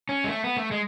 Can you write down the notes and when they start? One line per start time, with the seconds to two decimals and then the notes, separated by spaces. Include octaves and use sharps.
0.09 C#4
0.24 G#3
0.29 A3
0.44 B3
0.57 A3
0.71 G#3